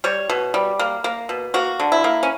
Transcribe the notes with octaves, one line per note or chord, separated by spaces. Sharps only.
G3 C#5
B2
G3
A#3
A#3
B2
A#3 F#4
D3
E4
A#3
C#4